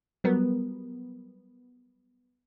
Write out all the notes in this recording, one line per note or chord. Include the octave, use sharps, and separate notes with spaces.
F#3 G3 B3 A#4